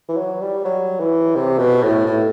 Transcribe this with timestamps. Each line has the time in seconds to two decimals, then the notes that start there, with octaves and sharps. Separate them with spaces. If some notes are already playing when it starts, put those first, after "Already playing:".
0.09 E3
0.17 F#3
0.42 G3
0.65 F#3
1.00 E3
1.35 C3
1.59 B2
1.83 A2
2.06 A2